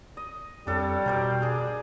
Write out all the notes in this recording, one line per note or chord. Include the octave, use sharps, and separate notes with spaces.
D#5
F2 G3 D4 A4 C#5
B2 A#4 C5 D5
D4 G#4